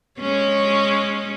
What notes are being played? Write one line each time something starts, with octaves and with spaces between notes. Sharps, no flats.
G#3 C#4 C#5